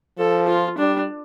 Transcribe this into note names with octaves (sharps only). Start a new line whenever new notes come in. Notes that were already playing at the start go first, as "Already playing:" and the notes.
F3 A4
F4
G3 D4